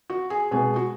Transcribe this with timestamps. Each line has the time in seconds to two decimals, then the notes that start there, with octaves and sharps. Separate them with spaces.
0.10 F#4
0.30 G#4
0.51 B2 G#3 B3 G#4
0.76 F#4